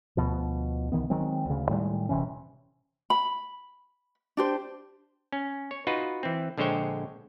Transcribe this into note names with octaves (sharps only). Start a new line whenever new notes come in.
D2 B2 F3
C2 D#3 E3 B3
D#3 F#3 G#3 C4
D2 C#3
A2 D#3 G3 G#3
E1 C3 E3 C#4
B5
D4 G4 C5
C#4
C#5
D#4 F4 F#4 B4
E3 C4
A#1 D3 G#3 C5 C#5 G5